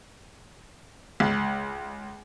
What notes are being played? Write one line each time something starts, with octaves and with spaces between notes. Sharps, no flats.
C#2